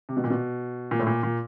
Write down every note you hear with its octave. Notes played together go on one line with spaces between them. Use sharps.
C3
B2
A#2
B2
A#2
A2
A#2
A#2